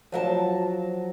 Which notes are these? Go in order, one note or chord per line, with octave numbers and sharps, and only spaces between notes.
F3 F#3 D#5 A5